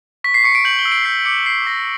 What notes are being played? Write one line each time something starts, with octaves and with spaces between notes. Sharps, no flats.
C#6 B6
C7
C#6 C#7
D7
G6 F#7
G7
E6
D7
G6 C7
D6 C#7
G6 C7
D6 A#6